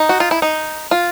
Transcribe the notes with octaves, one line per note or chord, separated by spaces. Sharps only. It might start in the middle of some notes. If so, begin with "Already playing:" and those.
Already playing: D#4
F#4
F4
E4
D#4
F4